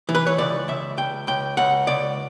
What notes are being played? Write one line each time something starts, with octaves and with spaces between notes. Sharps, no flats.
E3
B4
C#5
C#2 D5
C#2 E5
C#2 G5
C#2 G5
C#2 F#5
C#2 D5